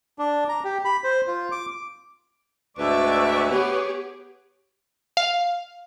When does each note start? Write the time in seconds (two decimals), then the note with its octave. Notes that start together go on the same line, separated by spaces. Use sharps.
0.19 D4
0.49 A#5
0.64 G4
0.85 B5
1.04 C5
1.27 F4
1.52 D6
2.78 D2 G#2 B4 D5 E5 C#6
3.50 B3 G4 G#4 C#5
5.17 F5